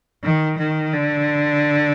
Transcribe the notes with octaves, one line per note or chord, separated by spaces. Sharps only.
D#3
D#3
D3